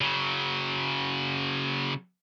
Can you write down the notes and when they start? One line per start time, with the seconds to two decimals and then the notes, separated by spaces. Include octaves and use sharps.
0.01 C#3 F#3